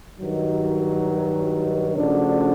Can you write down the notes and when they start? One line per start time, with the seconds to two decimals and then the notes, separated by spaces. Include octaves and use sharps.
0.18 G2 D#3 F#3
1.95 C#3 F3 A3 D4 F#4